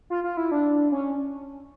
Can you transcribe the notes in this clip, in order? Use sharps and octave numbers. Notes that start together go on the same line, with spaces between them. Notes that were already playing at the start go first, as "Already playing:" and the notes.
F4
F4
E4
D4
C#4